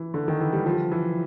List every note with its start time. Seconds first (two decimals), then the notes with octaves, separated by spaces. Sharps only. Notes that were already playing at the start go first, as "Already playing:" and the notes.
Already playing: E3
0.14 D3
0.28 D#3
0.41 E3
0.53 G3
0.66 F3
0.92 E3